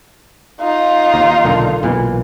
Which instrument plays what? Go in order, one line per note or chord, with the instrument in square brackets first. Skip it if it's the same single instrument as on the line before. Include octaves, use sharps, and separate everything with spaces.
[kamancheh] D#4 F4
[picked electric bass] D#2
B1 A#2 D3
B1 A#2 E3